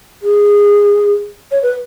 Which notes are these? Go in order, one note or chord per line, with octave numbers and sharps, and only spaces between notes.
G#4
C#5
B4